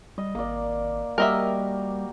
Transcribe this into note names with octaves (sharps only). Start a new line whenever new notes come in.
G3 D#5
G#1 A#3 D5
G3 A#3 F#4 G4 A#4 D#5 E5